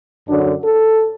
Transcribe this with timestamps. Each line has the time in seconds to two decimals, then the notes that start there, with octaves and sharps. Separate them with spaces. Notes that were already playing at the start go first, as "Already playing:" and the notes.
0.28 F#2 D3 F#3 D4
0.64 A4